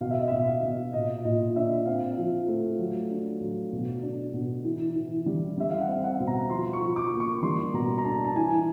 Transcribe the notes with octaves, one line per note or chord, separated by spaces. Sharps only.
B2 F5
E5
D#5
E5
B2
F5
B2
A#2 D#5
A#2 D#5
D4 E5
C4 F5
F3
A3
F#3
D4
F#3
B2
D4
B2
E3
E3
G3
G3 E5
F5
F#5
C4
F#5
B2
A#5
F3 C6
C#6
F3
D6
A#3
C#6
G3 C6
B2 A#5
A#5
D4 A5
A5
E3 G#5